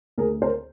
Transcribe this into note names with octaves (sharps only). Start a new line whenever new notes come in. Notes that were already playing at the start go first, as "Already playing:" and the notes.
D2 G#4 A#4
A#4 C5